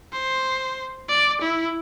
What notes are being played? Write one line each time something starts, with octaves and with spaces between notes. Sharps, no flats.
C5
D5
E4